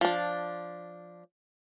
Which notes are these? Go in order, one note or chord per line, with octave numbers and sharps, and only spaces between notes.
F3 D4